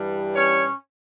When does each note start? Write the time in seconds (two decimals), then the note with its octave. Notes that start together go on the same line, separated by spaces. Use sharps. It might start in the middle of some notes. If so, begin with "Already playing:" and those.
Already playing: G2 E3 G3
0.35 C#4 C#5